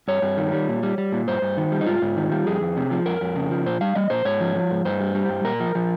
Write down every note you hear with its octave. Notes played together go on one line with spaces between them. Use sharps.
G2 C#5
G2
D#3
G3
A#2
G3
G3
A#2
G2 C5
G2
D#3
G3
D#4
G#2 F4
G#2
D#3
G3
F2 G#4
F2
C3
F3
F2 A#4
F2
C#3
F3
A#2 C5
G3 F5
G3 D#5
A#2 C5
G#2 C#5
F3
F3
G#2
G2 C5
G3
G3
G2
A#2 A#4
F3
F3